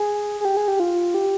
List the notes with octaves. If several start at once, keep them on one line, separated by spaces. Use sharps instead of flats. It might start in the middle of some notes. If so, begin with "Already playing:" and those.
Already playing: G#4
G#4
G4
G#4
G4
F4
G4